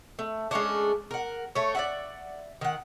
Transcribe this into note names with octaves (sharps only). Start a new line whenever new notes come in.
A3
G#3 A3 C#4 D4
A#4 F#5
A3 C#5
D5 E5 F#5
D#3 F#5